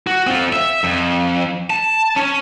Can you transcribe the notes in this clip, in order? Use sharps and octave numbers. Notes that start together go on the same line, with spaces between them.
F#4
C4 F4
E5
F2
A5
C#4